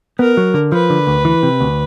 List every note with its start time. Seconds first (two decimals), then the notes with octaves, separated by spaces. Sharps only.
0.19 B3 A#4
0.37 F#3
0.54 D3
0.72 F3 B4
0.90 D3
1.07 D2
1.25 E3
1.43 C3
1.61 D2